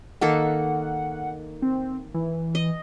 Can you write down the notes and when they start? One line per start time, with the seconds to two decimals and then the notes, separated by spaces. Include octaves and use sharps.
0.21 D#3 A#3 A4 F#5
1.62 C4
2.14 E3
2.55 D#5